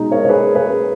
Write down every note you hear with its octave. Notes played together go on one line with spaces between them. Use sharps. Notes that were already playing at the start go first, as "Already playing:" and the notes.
Already playing: B2 G#3 D#4
A#4 C#5
C#5
G#4 B4
G#4 B4